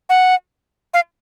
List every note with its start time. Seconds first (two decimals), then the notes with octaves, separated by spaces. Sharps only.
0.09 F#5
0.94 F5